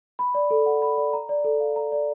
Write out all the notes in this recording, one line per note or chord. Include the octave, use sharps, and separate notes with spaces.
B5
D5
A4
F#5
B5
D5
A#5
D5
A4
F5
A#5
D5